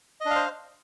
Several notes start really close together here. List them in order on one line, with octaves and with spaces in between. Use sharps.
D#5 D4 F5 C5